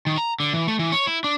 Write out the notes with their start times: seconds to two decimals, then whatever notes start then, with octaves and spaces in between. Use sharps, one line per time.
0.06 D#3
0.18 A#5
0.40 D3
0.54 E3
0.68 A3
0.79 E3
0.92 C#5
1.07 E4
1.24 D4